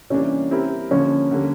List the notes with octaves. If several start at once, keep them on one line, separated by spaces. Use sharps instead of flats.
C3 E3 G3 A#3 C#4 D4
G3 C4 E4 G4 A#4
D3 F3 A#3 C#4
D3 G3 A#3